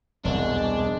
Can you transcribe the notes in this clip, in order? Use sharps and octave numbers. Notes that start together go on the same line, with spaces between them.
E1 C2 G#3 D4